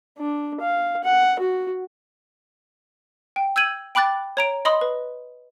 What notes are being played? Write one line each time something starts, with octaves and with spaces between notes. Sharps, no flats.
D4
F5
F#5
F#4
G5
E6 G6 G#6 D#7 F#7
G5 B5 D6 F#6 A6
C#5 A#5 D7
D#5 B5 C6 D#6
B4